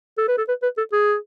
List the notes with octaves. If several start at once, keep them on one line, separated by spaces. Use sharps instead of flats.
A4
B4
A4
B4
B4
A4
G#4